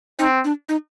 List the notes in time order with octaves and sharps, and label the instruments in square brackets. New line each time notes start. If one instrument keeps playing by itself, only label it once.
[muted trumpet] C4 [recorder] D#4
[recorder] D4
D#4